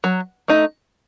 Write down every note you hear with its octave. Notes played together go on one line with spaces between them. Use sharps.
F#3
A3 D#4